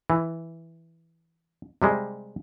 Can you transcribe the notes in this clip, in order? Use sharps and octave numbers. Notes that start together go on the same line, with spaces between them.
E3
C3 G3 G#3